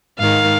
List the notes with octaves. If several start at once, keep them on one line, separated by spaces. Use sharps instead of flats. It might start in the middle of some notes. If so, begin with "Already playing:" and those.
G#2 D#3 F5